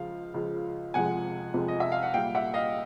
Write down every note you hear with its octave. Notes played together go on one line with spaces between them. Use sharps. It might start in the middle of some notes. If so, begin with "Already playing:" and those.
Already playing: C#2 C#3 F3 F5
C#2 C#3 F3
F2 C3 F3 G#3 F#5 G#5
F2 C3 F3 G#3
D#5
E5
F5
F#5
A#2 G3 F5 G5
E5 F#5
D#5 F5